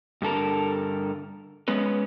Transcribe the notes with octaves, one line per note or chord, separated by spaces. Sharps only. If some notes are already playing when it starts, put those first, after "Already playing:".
G2 D3 A4 A#4
G#3 B3 C#4 B4